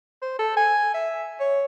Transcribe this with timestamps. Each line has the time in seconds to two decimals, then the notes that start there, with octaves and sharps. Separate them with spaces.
0.22 C5
0.39 A4
0.57 G#5
0.94 E5
1.40 C#5